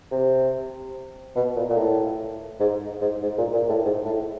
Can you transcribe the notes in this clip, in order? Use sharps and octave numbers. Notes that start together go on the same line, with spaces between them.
C3
B2
A#2
A#2
A2
G#2
G#2
G#2
A#2
A#2
A2
G#2
A2